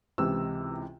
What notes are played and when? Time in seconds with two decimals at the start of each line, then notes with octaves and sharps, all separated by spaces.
0.18 C#2 C3 E3 E6